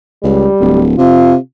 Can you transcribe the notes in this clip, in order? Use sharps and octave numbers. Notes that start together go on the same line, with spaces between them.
C#2 G3
D1
C3 F4